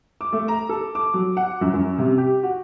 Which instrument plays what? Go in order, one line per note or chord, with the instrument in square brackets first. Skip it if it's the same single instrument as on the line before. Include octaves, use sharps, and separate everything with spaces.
[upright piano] D6
A3
A#5
A4
D6
F#3
F#5
F#2
F#2
C3
G4
F#4